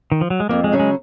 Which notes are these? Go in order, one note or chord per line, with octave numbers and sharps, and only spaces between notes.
D#3
F3
F#3
G#3
F2 A#3
G#3
C#3 F#3 C#4
G#3